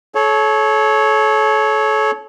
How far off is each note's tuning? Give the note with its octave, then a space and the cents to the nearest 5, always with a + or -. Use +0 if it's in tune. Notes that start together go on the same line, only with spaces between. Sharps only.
A4 -35 C#5 +0